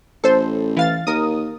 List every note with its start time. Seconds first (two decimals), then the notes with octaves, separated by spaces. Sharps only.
0.24 A1 A4 C5
0.77 E3 F5 A6
1.07 D#2 A#4 D#6